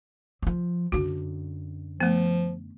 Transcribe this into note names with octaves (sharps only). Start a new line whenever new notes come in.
F3 F#3
F#2 D3 F#4
F3 A3 B3